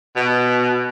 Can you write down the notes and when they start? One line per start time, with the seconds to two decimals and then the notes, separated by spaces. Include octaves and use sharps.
0.16 B2